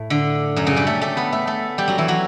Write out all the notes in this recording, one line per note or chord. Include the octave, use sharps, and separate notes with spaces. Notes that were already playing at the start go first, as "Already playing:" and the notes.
Already playing: A2 A3
D3
F#2 F#3
C#3 C#4
G3 G4
A3 A4
A3 A4
B3 B4
A3 A4
A3 A4
G3 G4
F#3 F#4
E3 E4
F#3 F#4